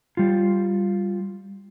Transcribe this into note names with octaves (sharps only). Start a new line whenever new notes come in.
G3 F4